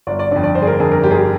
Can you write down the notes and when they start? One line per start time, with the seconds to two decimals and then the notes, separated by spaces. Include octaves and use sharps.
0.07 G1 D5
0.19 D5
0.31 D3 D5
0.36 F2
0.43 D5
0.55 G1 C5
0.62 G#4
0.67 A#4
0.80 F2 D3 G#4
0.92 A#4
1.03 G1 G4
1.11 G#4
1.18 G4